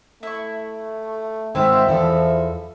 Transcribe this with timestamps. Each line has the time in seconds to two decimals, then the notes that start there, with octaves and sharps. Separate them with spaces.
0.23 A3 E4 C#6
1.55 G#2 D#3 C4 E4 F4 E5
1.88 E2 E3 F3 A4